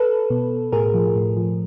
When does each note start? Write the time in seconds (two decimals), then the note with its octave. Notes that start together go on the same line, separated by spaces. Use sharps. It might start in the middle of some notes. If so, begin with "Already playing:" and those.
Already playing: A4 B4
0.30 B2
0.72 A2 G#4 A#4
0.94 F3
1.16 A2
1.37 F3